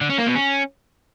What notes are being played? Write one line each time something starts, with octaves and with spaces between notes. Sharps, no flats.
D3
C#4
A#3
B2
C#4